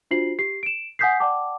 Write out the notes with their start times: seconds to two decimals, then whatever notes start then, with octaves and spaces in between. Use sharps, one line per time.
0.11 D4 F4 F#4 C5 C7 F#7
0.39 G4 C7
0.63 D7 E7
0.99 F#5 G#5 D#6 G6 B6 C7
1.20 D5 F#5 G5 A5 D6